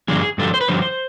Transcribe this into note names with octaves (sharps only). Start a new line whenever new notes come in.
G2 D3 F3 G#4
G2 D3 F3 A4
C5
B4
G2 D3 F3 C5